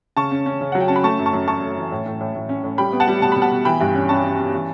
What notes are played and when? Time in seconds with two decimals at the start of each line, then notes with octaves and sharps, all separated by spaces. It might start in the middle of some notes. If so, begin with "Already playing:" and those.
0.17 C#3 A5 C#6
0.31 C#4
0.46 C#4
0.61 C#3
0.72 F#3 F#5
0.80 G5
0.88 C#4 A5
0.96 B5
1.04 A3 A5 C#6
1.19 F#2
1.26 A5 C#6
1.33 F#2
1.48 F#2 A5 C#6
1.63 A3
1.77 E3
1.91 A2
2.06 A2
2.21 A2
2.35 A2
2.49 C#4
2.64 A2
2.78 G3 G5 B5
2.93 B3
3.00 F#5 A5
3.08 G3
3.22 B2 A5
3.32 B2 B5
3.42 F#5 A5
3.51 B2
3.65 E3 G5 B5
3.81 G2
3.95 C#4
4.09 C#4 A5 C#6
4.23 C#4
4.38 C#4
4.53 E3